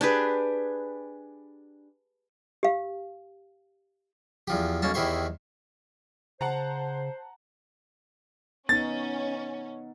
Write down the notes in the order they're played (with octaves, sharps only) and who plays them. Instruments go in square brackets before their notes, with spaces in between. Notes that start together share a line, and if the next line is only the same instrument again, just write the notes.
[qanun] D4 G4 G#4 B4
[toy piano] G4 F5
[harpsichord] E2 F3 G4
B1 A#3 C#4 A5
E2 D#3 E4 G4 C5 C#6
[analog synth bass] C#3 [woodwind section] C5 [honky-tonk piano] F#5 A5 A#5
[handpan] B3 D#4 [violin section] C#4 [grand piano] A6